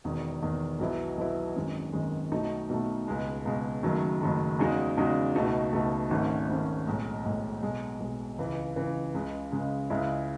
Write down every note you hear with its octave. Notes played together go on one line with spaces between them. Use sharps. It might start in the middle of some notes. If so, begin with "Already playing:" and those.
E1 E2 D#3
E1 E2 D#3
B1 B2 F#3 B3 E4
B1 B2 F#3 B3 E4
G#1 F#2 D#3 G#3
G#1 F#2 D#3 G#3
B1 B2 A3 D#4 F#4
B1 B2 A3 D#4 F#4
C#2 B2 G#3
C#2 B2 G#3
F#1 F#2 D#3 F#3 A3
F#1 F#2 D#3 F#3 A3
E2 C#3 G#3 D#4 F#4
E2 C#3 G#3 D#4 F#4
C#2 B2 A3 D#4 F#4
C#2 B2 A3 D#4 F#4
G#1 G#2 D#3 A3 C#4
G#1 G#2 D#3 A3 C#4
B1 A2 G#3
B1 A2 G#3
B1 B2 G#3
B1 B2 G#3
C#2 C#3 E3
C#2 C#3 E3
C#2 C#3 G#3
C#2 C#3 G#3
C#2 C#3 G#3 C#4 E4